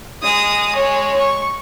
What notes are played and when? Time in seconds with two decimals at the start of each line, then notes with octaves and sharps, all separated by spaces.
0.22 G#3 D#6
0.75 G#3 C#5
1.19 C#6